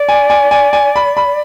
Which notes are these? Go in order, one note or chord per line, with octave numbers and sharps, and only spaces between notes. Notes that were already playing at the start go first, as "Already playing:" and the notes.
Already playing: D5
G#5
G#5
G#5
G#5
B5
B5